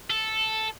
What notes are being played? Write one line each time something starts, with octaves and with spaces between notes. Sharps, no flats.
A4